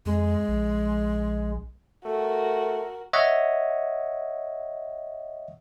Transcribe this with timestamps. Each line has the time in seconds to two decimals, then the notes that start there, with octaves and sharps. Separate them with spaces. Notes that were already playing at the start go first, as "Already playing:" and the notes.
0.06 F2 G#3
0.48 A#1
2.05 A3 F#4 A#4
3.13 C#5 D#5 E5 F#5